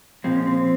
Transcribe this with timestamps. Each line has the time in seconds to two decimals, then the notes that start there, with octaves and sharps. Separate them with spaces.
0.24 A#2 F3 G#3 C4
0.35 C#4
0.47 C4